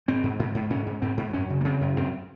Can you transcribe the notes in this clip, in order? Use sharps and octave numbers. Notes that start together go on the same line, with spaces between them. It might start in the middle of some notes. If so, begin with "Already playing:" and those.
G#2 C4
G#2
G#2
G#2
G#2 C#4
G#2
G#2 C4
G#2
F#2 C#4
C#3
A#3
C#3 C4
F#2
F#2 C4